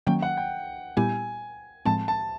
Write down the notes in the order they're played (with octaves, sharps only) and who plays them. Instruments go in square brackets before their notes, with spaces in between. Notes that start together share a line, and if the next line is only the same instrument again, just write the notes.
[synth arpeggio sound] D#3 F#3 A#3 C#4 [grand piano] G5
[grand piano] F#5
G5
[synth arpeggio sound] A#2 G3 B3 E4 G4 [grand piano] G#5
[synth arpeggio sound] A2 F3 G#3 C4 [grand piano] A5
[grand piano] A5